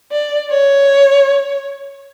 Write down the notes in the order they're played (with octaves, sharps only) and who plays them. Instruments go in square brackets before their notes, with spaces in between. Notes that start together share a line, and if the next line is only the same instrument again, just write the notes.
[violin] D5
C#5